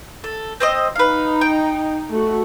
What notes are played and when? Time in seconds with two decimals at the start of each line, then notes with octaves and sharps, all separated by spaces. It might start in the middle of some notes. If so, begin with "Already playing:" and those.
0.24 A4
0.60 C4 C5 D#5
0.95 D#4 B4 F5
1.41 G5
2.11 A3 F#4